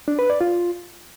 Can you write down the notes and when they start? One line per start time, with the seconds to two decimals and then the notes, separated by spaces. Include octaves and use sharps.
0.08 D4
0.19 B4
0.30 D5
0.41 F4